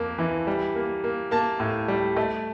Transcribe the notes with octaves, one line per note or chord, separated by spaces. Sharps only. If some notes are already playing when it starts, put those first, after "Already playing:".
Already playing: F2 A#3
E3
G3
A#3
A#3
A#3 A5
A2
G3
A3